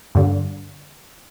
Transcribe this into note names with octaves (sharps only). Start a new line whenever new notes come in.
G2 D3